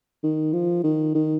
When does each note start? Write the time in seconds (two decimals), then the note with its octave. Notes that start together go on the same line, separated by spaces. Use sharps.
0.23 D#3
0.53 F3
0.84 D#3
1.15 D#3